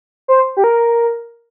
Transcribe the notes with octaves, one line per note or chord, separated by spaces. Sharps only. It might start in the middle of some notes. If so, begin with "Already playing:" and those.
C5
G4
A#4